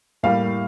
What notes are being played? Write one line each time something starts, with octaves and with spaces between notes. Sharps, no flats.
A2 G3 A#3 F5